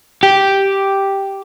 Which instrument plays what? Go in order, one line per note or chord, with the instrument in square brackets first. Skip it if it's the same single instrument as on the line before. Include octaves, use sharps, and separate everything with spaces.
[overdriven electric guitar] G4